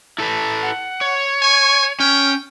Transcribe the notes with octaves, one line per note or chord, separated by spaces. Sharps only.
E4 A4 B4
F#5
C#5
G#5 C#6
C#4 G5 F6